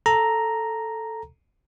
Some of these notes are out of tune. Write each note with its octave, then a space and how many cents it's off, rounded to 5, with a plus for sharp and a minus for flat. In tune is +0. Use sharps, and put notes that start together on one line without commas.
A4 +0 A#5 +0